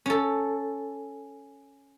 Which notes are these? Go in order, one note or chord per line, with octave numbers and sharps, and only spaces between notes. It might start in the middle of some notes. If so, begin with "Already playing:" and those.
C#4 A4